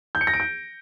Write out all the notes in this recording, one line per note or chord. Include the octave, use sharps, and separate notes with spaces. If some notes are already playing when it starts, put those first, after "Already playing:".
G6
C#7
A#6
D7
G6